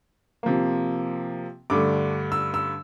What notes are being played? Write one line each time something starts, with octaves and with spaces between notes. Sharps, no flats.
C3 F3 A#3
G2 D3 A3 D6
E6
E6